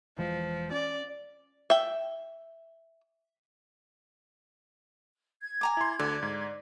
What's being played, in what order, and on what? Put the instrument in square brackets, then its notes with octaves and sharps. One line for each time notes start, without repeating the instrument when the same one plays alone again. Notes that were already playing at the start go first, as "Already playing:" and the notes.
[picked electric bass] E1 E3 G#3 [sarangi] F3
[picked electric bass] C#4 [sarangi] D5
[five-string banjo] E5 G5
[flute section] G#6
[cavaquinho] G#5 A#5 D6
[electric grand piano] E4 C6
[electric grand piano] D2 D3 [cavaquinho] D5
[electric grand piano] G#2